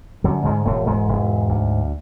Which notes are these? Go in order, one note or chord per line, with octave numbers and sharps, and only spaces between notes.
F#2 D3 F#3
G#2 G#3
E1 A2 A3
G#2 G#3
E1
D2